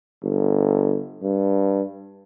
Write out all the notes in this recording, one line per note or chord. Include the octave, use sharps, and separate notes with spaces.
G1
G2